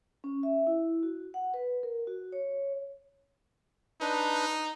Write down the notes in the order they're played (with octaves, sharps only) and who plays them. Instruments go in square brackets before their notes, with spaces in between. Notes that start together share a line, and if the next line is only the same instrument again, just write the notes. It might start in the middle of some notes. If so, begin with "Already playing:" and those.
[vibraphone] C#4
E5
E4
F#4
F#5
B4
A#4
F#4
C#5
[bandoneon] D4 B4 [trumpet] D#4